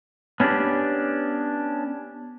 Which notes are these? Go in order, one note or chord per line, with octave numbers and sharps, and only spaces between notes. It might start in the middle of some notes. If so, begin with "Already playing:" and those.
B3 C#4 D4 E4 G4